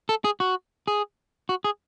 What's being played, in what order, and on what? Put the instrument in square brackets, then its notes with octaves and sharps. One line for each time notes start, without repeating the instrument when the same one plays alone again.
[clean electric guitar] A4
G#4
F#4
G#4
F#4
G#4